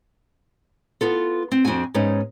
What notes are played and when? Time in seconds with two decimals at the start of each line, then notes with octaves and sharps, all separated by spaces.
1.01 B3 F4 A4
1.52 C4
1.65 F2 C4 D4 F#4 G#5
1.94 G#2 B3 C#4 D#4